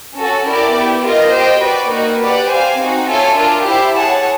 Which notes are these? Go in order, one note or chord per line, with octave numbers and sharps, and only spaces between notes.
C#4 F#4 A4
E4 G4 A#4 D5
B3 E4 G4
F4 A#4 D#5
G4 C5 D#5 G5
F#4 B4 D5
A#3 D#4 F#4
G4 B4 D5 F#5
G4 C5 F5 G#5
C4 D#4 F#4
F4 A4 C#5 E5 G#5
D4 F4 A#4
E4 G4 C5 E5
G#4 C#5 F#5 A5